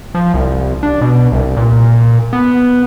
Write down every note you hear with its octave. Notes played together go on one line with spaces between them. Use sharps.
F3
C2
D4
B2
C2
A#2
B3